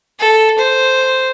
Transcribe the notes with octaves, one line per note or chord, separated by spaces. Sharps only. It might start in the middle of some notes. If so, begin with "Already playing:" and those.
A4
C5